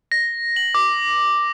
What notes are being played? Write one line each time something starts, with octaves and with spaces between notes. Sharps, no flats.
A#6
F#7
D6